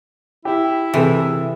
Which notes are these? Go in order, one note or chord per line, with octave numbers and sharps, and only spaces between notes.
E4 G4
C3 E3 G#4 A4